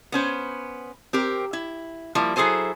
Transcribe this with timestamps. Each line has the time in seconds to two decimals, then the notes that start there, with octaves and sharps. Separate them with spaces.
0.12 B3 C#4 C5
1.13 C4 G4 A#4
1.53 E4
2.15 F3 G3 A#3 E4
2.36 F#3 E4 G#4 A4 C5 G#5